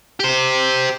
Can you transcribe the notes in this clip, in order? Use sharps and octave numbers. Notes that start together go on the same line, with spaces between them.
G4 C5